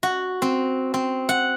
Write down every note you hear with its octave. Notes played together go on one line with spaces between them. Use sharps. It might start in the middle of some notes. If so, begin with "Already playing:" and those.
F#4
C4
C4
F#5